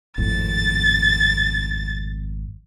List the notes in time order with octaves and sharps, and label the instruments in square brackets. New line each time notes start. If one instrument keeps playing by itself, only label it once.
[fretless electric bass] G#1 F2 A2 [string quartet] A6